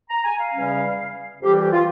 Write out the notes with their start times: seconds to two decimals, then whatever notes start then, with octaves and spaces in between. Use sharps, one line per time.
0.10 A#5
0.25 G#5
0.39 F5
0.54 E2 C#3 G3 C#4
1.42 F2 E3 G3 C4 G4
1.58 G4
1.72 F4